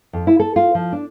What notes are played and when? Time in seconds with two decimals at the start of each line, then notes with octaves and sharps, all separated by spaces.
0.13 F2
0.27 E4
0.40 A4
0.56 F4
0.75 F3
0.93 D4